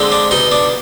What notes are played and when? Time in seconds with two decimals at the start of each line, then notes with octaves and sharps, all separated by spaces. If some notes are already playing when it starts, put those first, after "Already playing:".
Already playing: D3 G#3 C4
0.12 D4
0.31 B2 D#4
0.52 D4